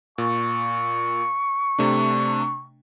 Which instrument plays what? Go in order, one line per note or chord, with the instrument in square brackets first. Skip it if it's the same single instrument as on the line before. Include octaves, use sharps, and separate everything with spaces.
[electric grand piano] A#2 [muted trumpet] C#6
[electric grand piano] C3 A3 D4